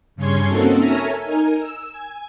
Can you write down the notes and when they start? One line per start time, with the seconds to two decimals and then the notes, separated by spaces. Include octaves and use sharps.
0.16 G2 C#3 C#4 C#5 C6 G#6
0.48 A#3 C4 C#4 D#4 F#4 A4
0.77 A4 A#4 C#5 E5 G#5 A#5
1.25 D#4 A#4 G#5
1.60 E6
1.92 G#5